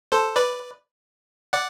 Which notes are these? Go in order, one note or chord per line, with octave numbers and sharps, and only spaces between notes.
A4 C5
B4 D5
D5 F#5